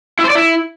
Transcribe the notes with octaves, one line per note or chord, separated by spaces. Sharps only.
E4
C5
D5
E4